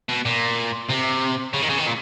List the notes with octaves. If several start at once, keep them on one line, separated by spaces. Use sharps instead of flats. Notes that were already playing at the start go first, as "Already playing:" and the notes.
B2
A#2
C3
C#3
D#3
C#3
D#3
A#2